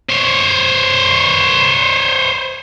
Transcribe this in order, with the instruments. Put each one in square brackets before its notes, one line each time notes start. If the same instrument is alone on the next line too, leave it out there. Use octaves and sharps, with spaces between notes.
[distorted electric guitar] C5 C#5